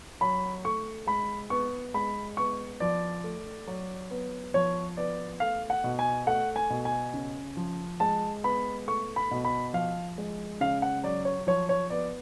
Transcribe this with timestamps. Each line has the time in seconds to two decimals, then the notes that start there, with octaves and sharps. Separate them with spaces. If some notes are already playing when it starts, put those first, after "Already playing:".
0.21 F#3 B5
0.64 A3 C#6
1.07 G#3 B5
1.50 B3 C#6
1.94 G#3 B5
2.37 B3 C#6
2.80 F3 D5
3.24 A3
3.67 F#3
4.11 B3
4.54 F3 C#5
4.97 B3 D5
5.40 A3 F5
5.70 F#5
5.84 B2
5.99 G#5
6.27 A3 F#5
6.56 G#5
6.70 B2
6.85 G#5
7.13 C#3
7.57 F3
8.00 G#3 A5
8.44 B3 B5
8.88 A3 C#6
9.16 B5
9.31 B2
9.44 B5
9.73 F3 F5
10.18 G#3
10.61 C#3 F5
10.82 F#5
11.04 F#3 D5
11.25 C#5
11.47 F3 C#5
11.69 C#5
11.90 B3 D5